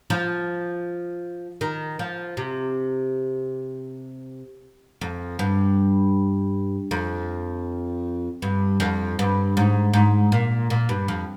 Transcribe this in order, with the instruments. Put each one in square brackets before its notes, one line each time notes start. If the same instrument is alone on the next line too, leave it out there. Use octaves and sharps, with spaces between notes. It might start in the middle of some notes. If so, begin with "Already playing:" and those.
[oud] F3
D#3
F3
C3
F2
G2
F2
G2
F2
G2
G#2
G#2
A#2
A#2
G2
F2